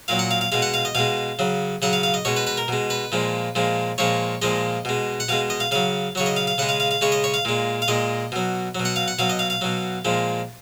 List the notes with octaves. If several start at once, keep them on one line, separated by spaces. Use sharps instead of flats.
A#2 F#3 F5
F#5
F5
F5
B2 G#3 F5
F#5
F5
D#5
B2 G#3 F5
C#3 F#3
C#3 F#3 F#5
F5
F5
D#5
B2 G#3 C#5
B4
B4
A#4
B2 G#3
B4
A#2 F3 G#3
A#2 F3 G#3
A#2 F3 G#3 C#5
A#2 F3 G#3 D#5
B2 G#3
F#5
B2 G#3 F5
D#5
F5
C#3 F#3 F5
C#3 F#3 C#5
D#5
F5
F5
C#3 G#3 F#5
F5
F5
F5
C#3 G#3 C#5
D#5
C#5
F5
A#2 G#3
F5
A#2 G#3 D#5
B2 F#3
B2 F#3
F#5
F5
F#5
B2 F#3 F5
D#5
F5
F5
B2 F#3
A#2 F3 G#3